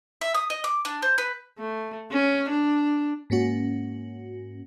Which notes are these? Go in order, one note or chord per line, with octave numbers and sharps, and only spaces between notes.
E5
D#6
D#5
D6
D4
C5
B4
A3
C#4
D4
G#2 A#3 C#4 F#4